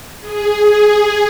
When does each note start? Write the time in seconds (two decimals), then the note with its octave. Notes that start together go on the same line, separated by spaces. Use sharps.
0.20 G#4
0.72 G#4